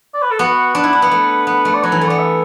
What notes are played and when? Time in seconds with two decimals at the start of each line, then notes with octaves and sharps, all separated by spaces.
0.14 D5
0.22 B4
0.31 A4
0.39 B3 F#4
0.75 D4 B4
0.84 E4
0.93 D4
1.02 B3
1.12 A3
1.47 B3
1.65 A3
1.74 D5
1.83 F#3 B4
1.92 E3
2.01 A3
2.08 B3 D5
2.19 E5